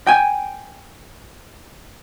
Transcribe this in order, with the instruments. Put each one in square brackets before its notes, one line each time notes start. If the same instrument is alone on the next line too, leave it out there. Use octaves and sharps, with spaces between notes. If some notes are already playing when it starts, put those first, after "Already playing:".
[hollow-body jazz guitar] G5 G#5